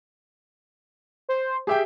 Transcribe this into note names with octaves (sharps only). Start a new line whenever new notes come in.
C5
G4 G#4 E5 G5